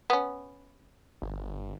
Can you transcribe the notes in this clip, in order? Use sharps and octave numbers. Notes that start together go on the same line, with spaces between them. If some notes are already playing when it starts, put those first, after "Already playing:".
B3 C#4
G1